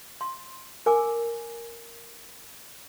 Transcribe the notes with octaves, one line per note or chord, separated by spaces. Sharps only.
C6
A#4 G#5 D6